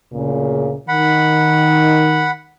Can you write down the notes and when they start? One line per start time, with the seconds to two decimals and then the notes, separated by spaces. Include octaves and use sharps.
0.12 D2 A#2 C#3
0.88 D#3 F#5 B5